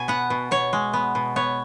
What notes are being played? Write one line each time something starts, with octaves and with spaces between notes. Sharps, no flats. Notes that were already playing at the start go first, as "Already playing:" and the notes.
Already playing: B2 G#5
B3 F#5
B2
B2 C#5
G#3
B3
B2
B3 C#5